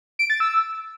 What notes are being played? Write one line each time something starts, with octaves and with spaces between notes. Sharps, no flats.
D7
A6
E6